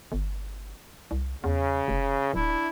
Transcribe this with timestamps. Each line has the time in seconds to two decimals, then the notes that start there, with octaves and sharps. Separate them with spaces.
0.12 G1
1.11 C2
1.44 E2 C#3
1.88 F1
2.33 D1 D4 E4